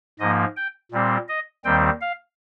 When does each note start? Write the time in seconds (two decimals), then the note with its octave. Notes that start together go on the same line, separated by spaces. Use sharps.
0.20 G#2 F3 A#3 D#5
0.56 G5
0.92 A#2 G3 C4
1.29 D#5
1.65 D#2 D#3 G3 C4 G5
2.01 F5